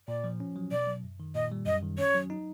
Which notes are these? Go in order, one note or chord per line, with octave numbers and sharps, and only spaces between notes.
A#2 D5
F3
C#4
F#3
B2 D5
F#3
F#2
D#3
A#2 D#5
G3
F#2 D#5
D#3
C#4 C#5
F#3
D#4